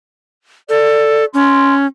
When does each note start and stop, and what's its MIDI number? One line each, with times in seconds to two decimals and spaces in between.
0.69 1.25 69
0.69 1.23 74
1.34 1.86 61
1.34 1.74 84